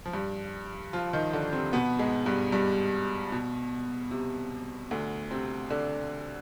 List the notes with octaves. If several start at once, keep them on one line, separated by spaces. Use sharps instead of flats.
F3
G2 G3
F3 F4
D#3 D#4
D3 D4
C3 C4
B2 B3
G#2 G#3
G2 G3
G2 G3
B2
C3
D2 D3
C3 C4
D3 D4